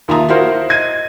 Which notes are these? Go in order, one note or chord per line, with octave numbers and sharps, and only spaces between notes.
D#2 F4 E5 A5 A#5 D#6
E4 F#4 A#4 C5 F5
D#5 G#6 D#7